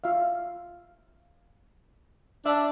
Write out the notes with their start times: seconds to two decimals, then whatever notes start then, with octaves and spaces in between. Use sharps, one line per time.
0.04 F4 E5 F5
2.46 D4 E5